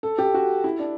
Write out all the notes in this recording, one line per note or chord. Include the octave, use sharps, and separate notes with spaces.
A4
G4
F#4
E4
D4